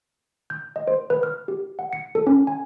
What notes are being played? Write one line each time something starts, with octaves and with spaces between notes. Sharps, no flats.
G6
D#5
C5
B4
F6
G4
F#5
C#7
A4
C#4
G#5